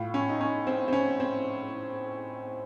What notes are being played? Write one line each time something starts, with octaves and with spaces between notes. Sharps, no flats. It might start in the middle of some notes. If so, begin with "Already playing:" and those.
Already playing: A2 F4
C#4
D#4
C#4
C4
C4
C#4
C4